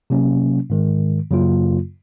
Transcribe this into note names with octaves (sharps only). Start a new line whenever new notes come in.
C3 F#3 A#3 C#4
G#2 D#3 G#3
F#2 C#3 F#3 A#3 F4